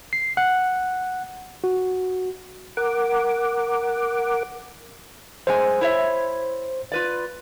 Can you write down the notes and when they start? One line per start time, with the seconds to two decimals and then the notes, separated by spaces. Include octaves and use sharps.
0.13 C7
0.37 F#5
1.64 F#4
2.77 A#4 F#5 D6
5.47 F#2 G#3 C5 G#5
5.81 E4 C#5 E5
6.92 F4 B4 D5